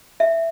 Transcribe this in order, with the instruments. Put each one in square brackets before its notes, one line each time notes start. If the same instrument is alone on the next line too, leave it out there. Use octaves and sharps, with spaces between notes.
[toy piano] E5